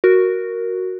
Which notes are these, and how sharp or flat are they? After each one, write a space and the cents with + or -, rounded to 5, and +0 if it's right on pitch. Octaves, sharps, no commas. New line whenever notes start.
F#4 +0 A#4 +0